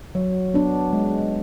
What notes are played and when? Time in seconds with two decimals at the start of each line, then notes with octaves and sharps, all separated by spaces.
0.15 F#3
0.54 B3 D4
0.93 G#3